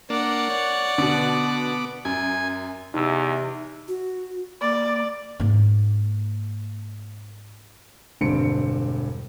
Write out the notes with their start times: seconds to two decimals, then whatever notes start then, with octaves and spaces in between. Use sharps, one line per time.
0.10 A#3 D4 D5 F#5
0.49 C#5
0.98 B2 D3 B3 D6
2.05 F#2 G#5
2.94 E2 C3 D#4 E6
3.88 F#4
4.61 A#3 D5
5.40 G#2 A#3
8.21 E1 G2 D3 C4 C#7 D7